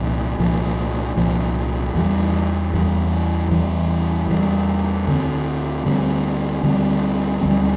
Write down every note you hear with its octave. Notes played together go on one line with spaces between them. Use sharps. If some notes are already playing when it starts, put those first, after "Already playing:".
Already playing: C2 A#2 F3
C2 A#2 F3
C2 A#2 F3
E2 E3 G3
E2 E3 G3
E2 E3 G3
E2 E3 G3
D2 D3 G3 C4
D2 D3 G3 C4
D2 D3 G3 C4
D2 D3 G3 C4